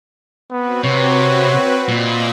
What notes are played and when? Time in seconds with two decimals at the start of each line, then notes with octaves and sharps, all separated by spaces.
0.51 B3 C4 F#4 B4
0.84 C3 C#5
1.88 A#2 D#5 B5 E6